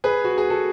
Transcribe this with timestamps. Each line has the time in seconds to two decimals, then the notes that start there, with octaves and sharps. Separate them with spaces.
0.04 G#4 B4
0.24 F#4
0.38 G#4
0.50 F#4 A4